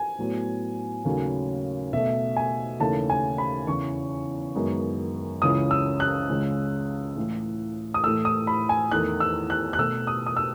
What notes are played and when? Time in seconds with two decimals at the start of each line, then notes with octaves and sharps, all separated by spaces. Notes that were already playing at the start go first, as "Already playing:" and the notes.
Already playing: G#5
0.19 A2 F#3 B3
1.05 D#2 C#3 F#3 A3
1.93 B2 A3 E5
2.36 G#5
2.80 D#2 C#3 E3 A3 A5
3.10 G#5
3.38 B5
3.67 E2 C#3 E3 C#6
4.55 F#2 D#3 G#3 B3
5.42 C#2 C#3 E3 D#6
5.71 E6
6.00 F#6
6.30 C#2 C#3 G#3
7.16 A2 E3 A3
7.94 D#6
8.03 A2 E3 A3 E6
8.25 D#6
8.47 B5
8.69 G#5
8.92 E2 D#3 A3 F#6
9.20 E6
9.50 F#6
9.73 F#6
9.78 B2 A3 E6
10.07 D#6
10.26 D#6
10.37 E6